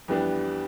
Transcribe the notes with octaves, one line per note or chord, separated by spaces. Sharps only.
F2 E3 G3 B3 D4